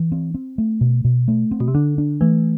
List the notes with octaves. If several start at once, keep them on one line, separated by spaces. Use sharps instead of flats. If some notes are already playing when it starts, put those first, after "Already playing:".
Already playing: E3
C4
C4
A3
B2
B2
A3
C4
B2
C3
D3 D4
D4
E3 A3